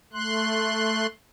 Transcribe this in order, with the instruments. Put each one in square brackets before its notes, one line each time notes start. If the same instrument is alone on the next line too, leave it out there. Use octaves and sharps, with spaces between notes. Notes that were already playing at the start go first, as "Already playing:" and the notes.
[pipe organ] A3 C6 F#6